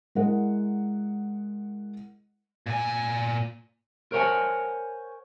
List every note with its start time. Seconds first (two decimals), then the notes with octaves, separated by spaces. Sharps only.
0.15 G#3 E4 A#4 D#5 F#5
2.66 A#2 G#5
4.12 A#4 C5 C#5 F5 F#5 G#5